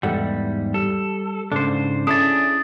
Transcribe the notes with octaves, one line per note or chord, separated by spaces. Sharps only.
E2 G#2 G3 A4 F#5
G3 A4
G#2 C#3 D4 A4 C5
C#4 D4 E4 G#4 A4 D#6 A6